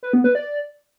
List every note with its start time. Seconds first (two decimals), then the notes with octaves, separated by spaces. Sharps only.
0.03 B4
0.13 B3
0.24 B4
0.35 D5